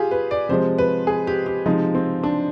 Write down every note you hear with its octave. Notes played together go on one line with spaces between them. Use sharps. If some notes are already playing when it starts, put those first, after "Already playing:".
Already playing: F4 G4 G#4
B4
D5
C3 F3 G#3 C5
B4
G#4
G4
G4
C3 F3 G#3 D#4
C4
D4